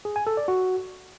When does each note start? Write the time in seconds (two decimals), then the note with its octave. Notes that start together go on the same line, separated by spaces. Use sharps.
0.05 G#4
0.16 G#5
0.27 A4
0.37 D5
0.48 F#4